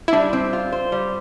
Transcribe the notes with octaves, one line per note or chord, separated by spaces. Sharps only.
E4
G3 D4
C4
F4
C5
G3